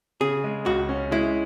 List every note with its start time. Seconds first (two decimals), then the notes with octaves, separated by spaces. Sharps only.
0.21 C#3 G#4
0.44 G#3
0.66 C#2 F#4
0.89 C#4
1.11 G#3 E4